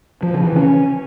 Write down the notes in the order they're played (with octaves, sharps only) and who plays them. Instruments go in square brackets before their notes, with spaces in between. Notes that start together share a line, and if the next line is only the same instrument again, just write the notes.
[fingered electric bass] F3
C#3
E3
C#4